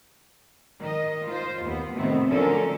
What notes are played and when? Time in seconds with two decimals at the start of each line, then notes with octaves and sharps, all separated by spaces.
0.79 D#3 D#5
1.27 F4 C5
1.62 D#2 B3
1.94 A2 C3 D#3 B3 C4
2.30 D3 F3 F#3 C#4 A4 A#4